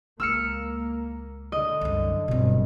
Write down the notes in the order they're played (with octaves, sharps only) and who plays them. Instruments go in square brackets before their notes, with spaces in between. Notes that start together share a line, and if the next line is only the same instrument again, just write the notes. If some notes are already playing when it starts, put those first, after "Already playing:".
[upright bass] C#2 [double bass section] A#3 [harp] E6 F6 C#7
[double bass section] D3 [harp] D#5
[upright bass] C2 F#2
[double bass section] G1 [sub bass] B2 [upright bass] F#3 C4